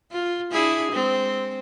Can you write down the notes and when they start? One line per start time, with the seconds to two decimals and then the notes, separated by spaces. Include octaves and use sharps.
0.12 F4
0.52 D4 E4 G#4
0.93 G#3 C4